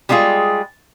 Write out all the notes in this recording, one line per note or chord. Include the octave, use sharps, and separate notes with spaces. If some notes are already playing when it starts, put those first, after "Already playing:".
G3 G#3 D4 F4 G#4